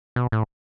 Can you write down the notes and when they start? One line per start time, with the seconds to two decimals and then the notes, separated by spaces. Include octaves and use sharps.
0.16 B2
0.32 A2